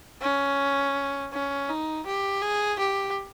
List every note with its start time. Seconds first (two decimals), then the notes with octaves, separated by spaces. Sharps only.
0.22 C#4
1.32 C#4
1.69 D#4
2.06 G4
2.42 G#4
2.79 G4